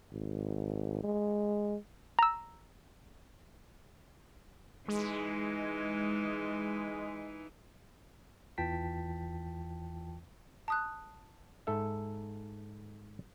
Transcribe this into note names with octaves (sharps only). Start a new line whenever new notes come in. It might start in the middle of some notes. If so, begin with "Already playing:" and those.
G#1
G#3
A#5 E6
E3 G#3 D#4
E2 E3 F4 G5 A5 B6
A5 D#6 F#6
G#2 A4 E5